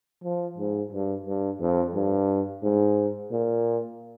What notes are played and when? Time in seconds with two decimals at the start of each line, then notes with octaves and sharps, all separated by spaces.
0.24 F3
0.58 G#2
0.92 G2
1.26 G2
1.61 F2
1.95 G2
2.63 G#2
3.31 A#2